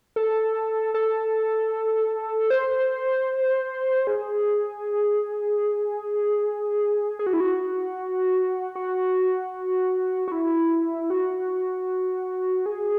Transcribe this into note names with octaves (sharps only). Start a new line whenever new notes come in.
A4
A4
C5
G#4
G#4
F#4
E4
F#4
F#4
F#4
E4
F#4
G#4